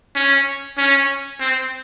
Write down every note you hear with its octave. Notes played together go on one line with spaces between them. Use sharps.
C#4
C#4
C4